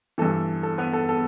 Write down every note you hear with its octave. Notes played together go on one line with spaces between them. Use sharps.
G2 E3 A4
A4
B3 B4
A4
A4